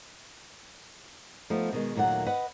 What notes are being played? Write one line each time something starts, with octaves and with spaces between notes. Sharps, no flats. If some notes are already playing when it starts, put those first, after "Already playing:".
F3 A3 B3 D#4
B2 D#3 G#3
D#2 A#2 F#3 A3 F#5
B4 D#5 F#5